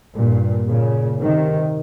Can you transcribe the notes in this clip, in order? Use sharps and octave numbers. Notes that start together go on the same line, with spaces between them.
G2 A#2
A#2 C#3
C3 D#3